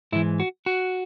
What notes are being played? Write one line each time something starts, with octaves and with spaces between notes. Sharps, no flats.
G#2 E3 E4
F#4
F#4